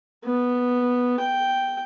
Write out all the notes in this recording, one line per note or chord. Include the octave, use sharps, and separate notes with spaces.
B3
G5